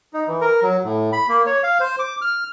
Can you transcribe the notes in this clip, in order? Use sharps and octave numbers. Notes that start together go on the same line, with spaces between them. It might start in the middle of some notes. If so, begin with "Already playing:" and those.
D#4
E3
A#4
F#3
A2
B5
A#3
C#5
F5
C5
D6
F6